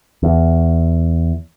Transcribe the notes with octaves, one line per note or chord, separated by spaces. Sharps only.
E2